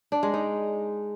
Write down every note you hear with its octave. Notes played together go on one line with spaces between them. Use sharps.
D4
G#3
D#4